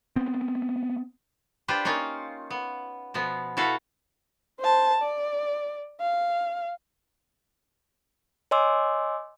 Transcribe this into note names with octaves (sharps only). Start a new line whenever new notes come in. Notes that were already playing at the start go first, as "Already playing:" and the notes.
B3 C4
D4 F4 G4 B4 C5
A#3 C#4 D#4 F4
B3
B2 F3 B3
E4 F#4 A4 B4 F5 F#5
C5 A5
D5
F5
C#5 D#5 G#5 C6 D6 E6